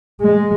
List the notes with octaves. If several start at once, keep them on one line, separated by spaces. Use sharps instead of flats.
G#3